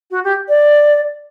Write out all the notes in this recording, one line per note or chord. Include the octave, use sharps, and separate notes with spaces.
F#4
G4
D5